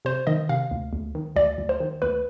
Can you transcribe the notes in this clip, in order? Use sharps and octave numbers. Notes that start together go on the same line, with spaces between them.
C3 C5
D#3 D#5
C3 F5
D2
D2
D#3
D2 D5
D2
C5
D#3
D2 B4